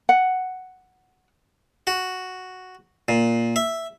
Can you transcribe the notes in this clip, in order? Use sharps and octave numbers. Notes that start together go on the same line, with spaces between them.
F#5
F#4
A#2
E5